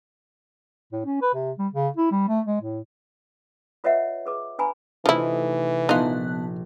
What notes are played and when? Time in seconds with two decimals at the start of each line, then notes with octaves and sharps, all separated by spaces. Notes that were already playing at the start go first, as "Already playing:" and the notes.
0.92 A2
1.06 C#4
1.22 B4
1.34 C3
1.58 G3
1.73 C#3
1.97 E4
2.11 G3
2.28 A3
2.46 G#3
2.61 A2
3.84 F4 B4 C#5 D#5 E5 F#5
4.26 G#4 B4 D6
4.59 D4 B4 G#5 A#5 B5
5.06 C3 E3 F3 A3 D#4 E4
5.89 A#1 B3 D#4 F4 A5 F#6